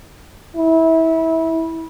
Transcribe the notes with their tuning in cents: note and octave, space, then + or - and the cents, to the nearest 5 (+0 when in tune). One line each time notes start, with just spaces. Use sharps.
E4 -25